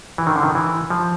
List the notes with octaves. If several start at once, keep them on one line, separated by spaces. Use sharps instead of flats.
E3
D#3
D3
D#3
E3
F3